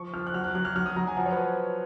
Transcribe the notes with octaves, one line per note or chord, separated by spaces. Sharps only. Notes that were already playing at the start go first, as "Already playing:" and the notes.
Already playing: F3 C#6
F3 F6
F#6
F#3 F6
F#6
F#3 F#6
F6
F#3 F6
D#6
F#3 A#5
G#5
F3 F#5
C#5
B4